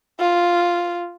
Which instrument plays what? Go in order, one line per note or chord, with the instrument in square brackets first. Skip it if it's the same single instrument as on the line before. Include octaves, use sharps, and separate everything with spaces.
[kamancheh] F4